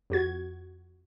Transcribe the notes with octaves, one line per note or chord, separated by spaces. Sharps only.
F2 F#4 G#6